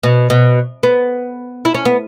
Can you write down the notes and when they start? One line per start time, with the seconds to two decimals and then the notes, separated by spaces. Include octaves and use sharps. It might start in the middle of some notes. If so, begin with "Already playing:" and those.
0.03 B2
0.30 B2
0.83 B3
1.65 E4
1.74 C#4
1.85 B3